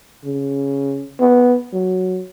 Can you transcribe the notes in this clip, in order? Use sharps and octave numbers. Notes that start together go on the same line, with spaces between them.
C#3
B3
F#3